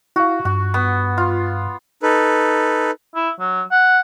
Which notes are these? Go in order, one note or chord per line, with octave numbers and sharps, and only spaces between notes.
E4 F#4 F5
G2 F#4
B3
F4
D#4 A4 B4
E4
F#3
F#5